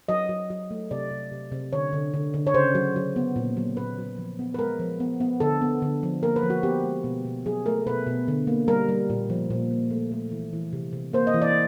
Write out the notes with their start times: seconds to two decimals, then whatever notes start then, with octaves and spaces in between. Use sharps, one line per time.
0.09 F#3 D#5
0.29 F#3
0.50 F#3
0.71 A3
0.91 C3 D5
1.11 C3
1.32 C3
1.52 C3
1.73 D3 C#5
1.93 D3
2.14 D3
2.34 D3
2.47 C#5
2.54 C#3 C5
2.75 F#3
2.96 F#3
3.16 B3
3.36 A#2
3.57 F#3
3.77 A#2 B4
3.98 F#3
4.18 F3
4.39 B3
4.54 B4
4.59 G#3 A#4
4.80 F3
5.00 B3
5.20 B3
5.40 D3 A4
5.61 B3
5.82 D3
6.03 F3
6.23 A#3 A#4
6.36 B4
6.43 F3
6.50 F#4
6.63 B3 G4
6.84 G#3
7.04 B2
7.25 B2
7.46 F#3 G#4
7.66 A3 A#4
7.87 B2 B4
8.07 B2
8.28 D3
8.47 A#3
8.68 G3 A#4
8.88 G3
9.10 A#2
9.30 F3
9.50 A#2
9.71 A#3
9.91 A3
10.12 A3
10.32 E3
10.53 E3
10.73 C3
10.93 C3
11.13 A#3 C5
11.27 D#5
11.34 E3
11.42 D5